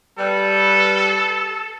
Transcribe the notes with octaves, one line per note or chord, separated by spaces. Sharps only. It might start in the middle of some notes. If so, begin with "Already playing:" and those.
G3 A4 B4